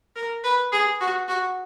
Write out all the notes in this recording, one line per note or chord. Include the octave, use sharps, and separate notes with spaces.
A#4
B4
G#4
F#4
F#4